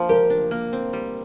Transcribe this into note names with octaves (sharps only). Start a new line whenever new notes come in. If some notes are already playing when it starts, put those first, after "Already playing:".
Already playing: F3 A#3 D4
G4 A#4
D4
A#3
C4
G3